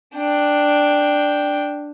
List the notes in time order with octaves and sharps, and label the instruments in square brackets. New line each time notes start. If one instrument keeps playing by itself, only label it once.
[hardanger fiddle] D4 G5